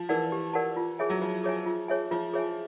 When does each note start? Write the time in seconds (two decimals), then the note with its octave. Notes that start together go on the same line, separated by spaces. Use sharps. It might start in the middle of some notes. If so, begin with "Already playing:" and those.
Already playing: F3
0.09 E3 A#4 D5 F#5 A5
0.32 G4
0.53 A#4 D5 F#5 A5
0.76 F4
0.99 G#4 C#5 E5 G#5
1.10 F#3
1.21 F3 F4
1.44 G#4 C#5 E5 G#5
1.66 F4
1.88 G#4 C#5 E5 G#5
2.11 F3 F4
2.34 G#4 C#5 E5 G#5